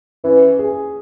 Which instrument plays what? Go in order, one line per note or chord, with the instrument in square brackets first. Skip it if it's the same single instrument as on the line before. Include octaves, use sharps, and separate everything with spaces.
[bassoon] E3 [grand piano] C#4
[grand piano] G#4